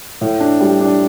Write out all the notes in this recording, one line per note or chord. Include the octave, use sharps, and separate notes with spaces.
A2
D4
G3
D4